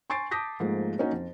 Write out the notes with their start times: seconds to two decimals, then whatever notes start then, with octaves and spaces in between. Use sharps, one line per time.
0.10 G#5 C6 C#6 A6 C7 D7
0.31 A5 D6 D#6 G6 A#6 B6
0.60 G#2 F3 A3 A#3
0.98 A#3 C#4 D#4 F#4
1.12 F2